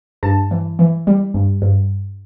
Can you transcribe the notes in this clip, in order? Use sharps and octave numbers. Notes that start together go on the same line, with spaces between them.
G2 A5
E3
E3
G3
G2
G2